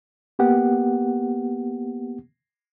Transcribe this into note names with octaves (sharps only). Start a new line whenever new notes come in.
A#3 B3 G4 F#5